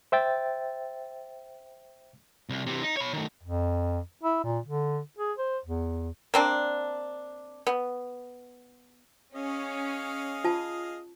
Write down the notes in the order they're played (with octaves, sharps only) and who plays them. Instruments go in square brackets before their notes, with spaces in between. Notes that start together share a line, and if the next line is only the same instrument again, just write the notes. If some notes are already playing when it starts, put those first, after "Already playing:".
[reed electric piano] C5 E5 G5 A6
[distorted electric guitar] C2
C3 E3
D#4
C#5 B5
D#3 A3
[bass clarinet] F2
E4
A#2
D3
G#4
C5
E2
[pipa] A#3 C4 D4
B3
[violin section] C#4 [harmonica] G#4 D#5 F5
[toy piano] F4 A5